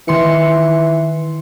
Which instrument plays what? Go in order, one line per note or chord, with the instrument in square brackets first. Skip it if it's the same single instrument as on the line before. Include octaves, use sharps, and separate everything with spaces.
[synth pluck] D#3 C6 C#7 [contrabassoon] E3